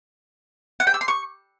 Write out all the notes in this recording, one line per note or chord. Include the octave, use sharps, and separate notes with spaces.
F#5
G5
E6
C6
C#6